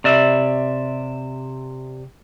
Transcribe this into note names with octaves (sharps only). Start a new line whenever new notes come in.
C3 D5 E5